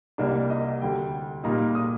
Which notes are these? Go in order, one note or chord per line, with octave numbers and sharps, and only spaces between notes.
C2 C3 G3 A#3 D4 D#5
D#5
D2 D3 G3 G5
A#2 G3 A#3 D#4 A#5
D#6